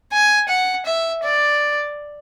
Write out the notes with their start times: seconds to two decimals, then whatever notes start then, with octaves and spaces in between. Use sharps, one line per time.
0.13 G#5
0.49 F#5
0.86 E5
1.23 D5